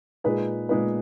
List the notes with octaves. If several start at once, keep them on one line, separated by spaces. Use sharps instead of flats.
A#2 G#3 D#4 G#4 B4
A#2 G#3 D#4 G#4 B4